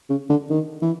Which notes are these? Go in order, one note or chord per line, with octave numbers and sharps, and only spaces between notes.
C#3
D3
D#3
E3